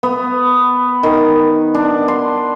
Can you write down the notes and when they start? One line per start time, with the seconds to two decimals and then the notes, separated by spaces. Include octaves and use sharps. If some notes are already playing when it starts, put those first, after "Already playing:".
0.03 B3
1.03 D#3
1.74 D4
2.08 C6